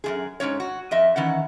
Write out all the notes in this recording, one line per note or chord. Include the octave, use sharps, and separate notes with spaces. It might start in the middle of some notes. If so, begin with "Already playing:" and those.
F#2 C3 G#4
G#2 E3 C#4 C#5
F#4
F2 D#5 E5
D#3 E3 C#4 F#5